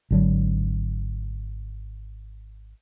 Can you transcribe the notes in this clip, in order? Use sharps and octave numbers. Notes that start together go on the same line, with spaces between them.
G#1 D3 F#3